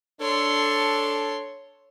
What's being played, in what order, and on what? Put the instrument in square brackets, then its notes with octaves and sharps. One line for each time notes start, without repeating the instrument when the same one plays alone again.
[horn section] D4 A4 [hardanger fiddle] C#5 C6